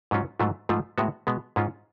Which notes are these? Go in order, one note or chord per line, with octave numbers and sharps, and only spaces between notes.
G#2 F#3 C#4 F4
G#2 F#3 A3 F4
G#2 F3 A3 F4
A2 G#3 B3 F#4
B2 G#3 B3
G#2 G#3 C#4 F4